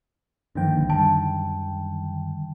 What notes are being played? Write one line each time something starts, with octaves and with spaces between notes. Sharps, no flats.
G2 D3 D#3 F3 A#3 G5
C2 A2
F#2 G3 A5